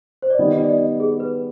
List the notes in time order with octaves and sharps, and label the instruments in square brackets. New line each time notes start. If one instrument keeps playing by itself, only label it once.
[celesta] C5
D5
[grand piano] D#3 G3 B3 [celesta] D#5
[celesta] D5
D#5
G#4
B4